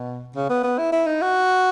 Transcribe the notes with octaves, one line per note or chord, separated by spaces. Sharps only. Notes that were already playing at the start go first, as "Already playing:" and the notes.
Already playing: B2
C#3
B3
B3
E4
E4
D#4
F#4